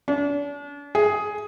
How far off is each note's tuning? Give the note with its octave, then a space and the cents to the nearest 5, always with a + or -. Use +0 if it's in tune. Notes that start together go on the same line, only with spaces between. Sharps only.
D4 -40
G#4 +5